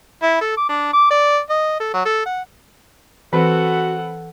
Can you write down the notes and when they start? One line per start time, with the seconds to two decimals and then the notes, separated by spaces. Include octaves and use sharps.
0.22 E4
0.41 A4
0.57 D6
0.69 D4
0.93 D6
1.10 D5
1.50 D#5
1.80 A4
1.94 F#3
2.06 A4
2.26 F#5
3.33 E3 C4 F#4 A4 B4 F#5